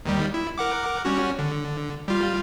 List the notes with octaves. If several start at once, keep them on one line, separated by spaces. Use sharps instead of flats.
D#2 D#3 G3
E4
A#4 F#5 D6
G3 C#4 F#4
D3
G3 F4